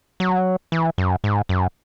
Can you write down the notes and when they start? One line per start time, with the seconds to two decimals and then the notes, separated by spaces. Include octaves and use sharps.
0.20 F#3
0.72 E3
0.98 F#2
1.24 G#2
1.49 F#2